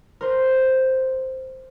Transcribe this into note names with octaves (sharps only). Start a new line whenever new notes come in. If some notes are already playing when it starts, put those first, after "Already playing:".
A#4 C5